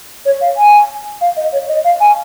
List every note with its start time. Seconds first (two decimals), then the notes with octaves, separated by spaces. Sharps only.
0.25 C#5
0.41 F5
0.57 G#5
1.21 F5
1.37 D#5
1.52 C#5
1.69 D#5
1.85 F5
2.00 G#5